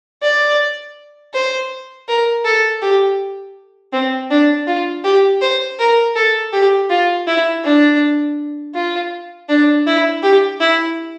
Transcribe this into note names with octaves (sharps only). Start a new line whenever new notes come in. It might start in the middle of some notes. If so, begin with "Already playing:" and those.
D5
C5
A#4
A4
G4
C4
D4
F4
G4
C5
A#4
A4
G4
F4
E4
D4
F4
D4
E4
G4
E4